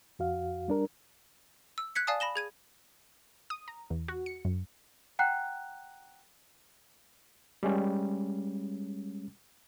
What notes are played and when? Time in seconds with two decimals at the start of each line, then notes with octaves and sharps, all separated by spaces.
0.19 F2 F#4 F5
0.68 G3 D4 A#4
1.78 E6
1.95 F#6 G#6 B6 C#7
2.07 D5 F5 G#5 A5 D#6
2.20 B5 A#6 E7 G7
2.36 G#4 G#6 D#7
3.50 D#6
3.68 A#5
3.90 E2
4.08 F#4
4.26 C#7
4.45 F#2
5.19 F#5 G5 A#5 F#6
7.63 G3 G#3 C#4